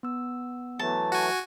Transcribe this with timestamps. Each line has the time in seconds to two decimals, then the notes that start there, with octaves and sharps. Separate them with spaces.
0.03 B3 E6
0.79 E3 F#3 A3 A5
1.12 F#4 G#5